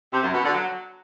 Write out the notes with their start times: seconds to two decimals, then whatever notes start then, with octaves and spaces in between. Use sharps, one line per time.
0.13 C3
0.23 F#2
0.34 B2
0.44 D3
0.54 F#3